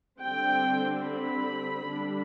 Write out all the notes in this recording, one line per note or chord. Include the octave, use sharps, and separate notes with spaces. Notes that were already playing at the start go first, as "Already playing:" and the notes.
D3 G3 C4 G5
B5
D3 G3 D4